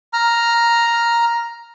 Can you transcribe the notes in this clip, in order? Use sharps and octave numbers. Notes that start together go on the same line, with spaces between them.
A#5 F6